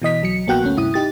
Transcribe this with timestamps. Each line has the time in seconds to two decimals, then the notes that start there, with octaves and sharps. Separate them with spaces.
0.02 B2 E3 D#5 B6
0.22 B1 F#3 C#7
0.47 A#1 A#3 B3 F#4 G5 F#6
0.64 D2 A3 C#4
0.77 G2 C3 E4 D#6
0.94 D#4 G4 A6